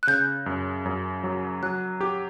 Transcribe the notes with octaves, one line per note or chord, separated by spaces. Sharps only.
F#6
C#3 G6
F#2
F#2
F#3
F#3 F#6
G4 D6